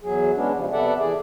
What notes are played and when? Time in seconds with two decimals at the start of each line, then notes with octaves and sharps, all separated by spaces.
0.01 E2 F#3 G#4
0.36 G#3 B3 C#4 D4
0.56 C#3 F3 G3
0.72 C3 B3 A4 D5 E5 F#5
0.98 E3 G#4 D5